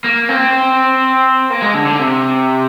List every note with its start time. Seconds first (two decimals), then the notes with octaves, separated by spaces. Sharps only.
0.04 A#3
0.29 C4
1.51 A#3
1.62 G#3
1.74 D3
1.86 D3
1.99 C3